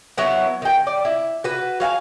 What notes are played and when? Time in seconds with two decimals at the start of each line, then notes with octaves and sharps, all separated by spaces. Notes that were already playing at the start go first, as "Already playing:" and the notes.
0.18 F#3 B3 E4
0.62 D#3 G5
0.87 D5
1.05 E4
1.44 F#4 B4
1.80 F#3 F5 F#5 G#5